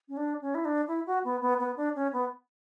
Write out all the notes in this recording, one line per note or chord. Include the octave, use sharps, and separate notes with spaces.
C#4
D4
C#4
E4
D4
E4
F#4
B3
B3
B3
D4
C#4
B3